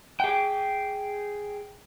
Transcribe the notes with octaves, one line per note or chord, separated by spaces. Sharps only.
G#4 G5